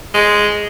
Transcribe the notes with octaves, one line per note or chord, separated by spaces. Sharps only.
G#3